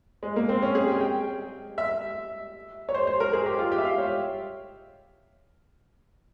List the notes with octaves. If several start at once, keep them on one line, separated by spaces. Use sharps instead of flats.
G#3
A#3
C4
C#4
G#4
G5
G5
E5
C#5
C5
C5
A#4
G#4
G4
F4
G4
E5
F5
C#5